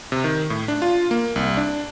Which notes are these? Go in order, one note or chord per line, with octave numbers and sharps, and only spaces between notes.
C3
D#3
A2
D4
F4
A#3
C2
D4